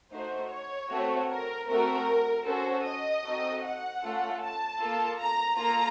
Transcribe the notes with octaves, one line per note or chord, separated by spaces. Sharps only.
A3 D#4 F#4 C5
C#5
A3 C4 F#4 A4
A#4
A3 C4 F#4 A#4
C#4 F#4 A4 C5
D#5
C4 D#4 F#4 A4
F#5
A3 C#4 F4 A4
A5
A#3 F4 A4
A#5
A#3 F4 A4 A#5